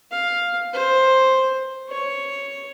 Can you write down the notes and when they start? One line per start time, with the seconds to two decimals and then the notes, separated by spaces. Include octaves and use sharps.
0.11 F5
0.74 C5
1.89 C#5